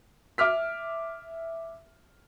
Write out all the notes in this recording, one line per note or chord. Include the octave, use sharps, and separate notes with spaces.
E5 D6 F6 B6